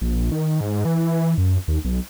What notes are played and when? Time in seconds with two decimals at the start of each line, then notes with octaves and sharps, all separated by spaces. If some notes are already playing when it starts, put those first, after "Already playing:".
0.01 A#1
0.32 D#3
0.61 G#2
0.85 E3
1.38 F#2
1.68 D#2
1.84 B1